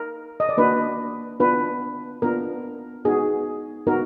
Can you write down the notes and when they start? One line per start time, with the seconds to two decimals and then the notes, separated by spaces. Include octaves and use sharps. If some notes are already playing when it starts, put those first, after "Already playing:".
Already playing: A#4
0.40 D#5
0.49 D5
0.57 A#3 D4 F#4 B4
1.40 B3 D4 F4 B4
2.22 B3 D4 F4 A#4
3.05 B3 D#4 F#4 G#4
3.87 B3 D#4 F#4 A#4